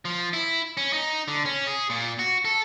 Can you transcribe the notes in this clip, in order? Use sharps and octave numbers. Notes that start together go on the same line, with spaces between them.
F3
E4
C#4
D#4
D3
C#4
G#4
A#2
F#4
A4